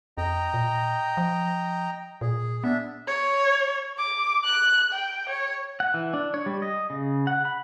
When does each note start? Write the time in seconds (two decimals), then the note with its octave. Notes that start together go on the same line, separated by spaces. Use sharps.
0.18 F2 D#5 G5 A#5
0.54 A#2
1.17 F3
2.21 A#2 G#4
2.64 B3 D4 E5
3.07 C#5
3.98 D6
4.44 F#6
4.92 G5
5.29 C#5
5.80 F#5
5.94 E3
6.14 D4
6.34 C#5
6.46 G3
6.62 D#5
6.90 C#3
7.27 F#5
7.45 B5